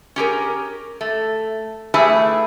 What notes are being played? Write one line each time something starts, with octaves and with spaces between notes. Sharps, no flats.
C#4 G4 G#4 A#4
A3
A3 E4 G4 G#4 B4 E5